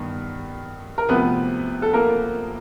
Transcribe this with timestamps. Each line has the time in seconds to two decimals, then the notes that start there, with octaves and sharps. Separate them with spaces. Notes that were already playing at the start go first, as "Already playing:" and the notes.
Already playing: G2 D#3 B3
0.98 A#4
1.09 D2 C3 F3 B3 B4
1.82 A4
1.93 A#3 A#4